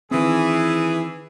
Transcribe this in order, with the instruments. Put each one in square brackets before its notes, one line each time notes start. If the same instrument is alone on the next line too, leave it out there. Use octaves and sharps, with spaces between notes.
[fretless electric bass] D#3 C4 [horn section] E3 G#4